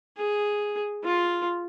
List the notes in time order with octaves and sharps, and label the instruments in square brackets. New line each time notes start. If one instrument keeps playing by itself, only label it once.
[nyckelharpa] G#4
F4